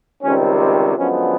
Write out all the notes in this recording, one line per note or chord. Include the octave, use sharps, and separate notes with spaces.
C#2 C3 D#3 G3 C4 C#4
C4
F#2 D3 F3 G#3 B3 C#4